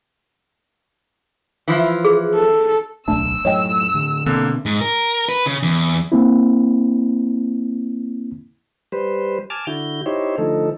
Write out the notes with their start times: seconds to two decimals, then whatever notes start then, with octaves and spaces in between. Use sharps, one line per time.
1.68 E3 F3 E4
2.05 G#4
2.35 A4
3.08 D1 B1 A3 D4 A5 E6
3.45 F#2 A2 C#5 D#5 G5
3.94 A2 D3
4.26 B2 D3 A#3 C4 D4
4.66 G#2
4.81 A#4
5.29 B4
5.46 C#3
5.63 E2
6.12 A#3 C4 E4
8.92 G3 B4 C5
9.50 G#5 A5 D6 F6
9.67 D3 E4 F#4 G6
10.06 D#4 E4 G4 C5 C#5
10.38 D3 F3 A3 D#4 A4